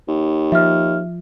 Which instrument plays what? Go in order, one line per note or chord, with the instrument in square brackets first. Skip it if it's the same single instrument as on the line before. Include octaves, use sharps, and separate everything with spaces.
[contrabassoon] D#2
[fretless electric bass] F3 [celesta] E5 F6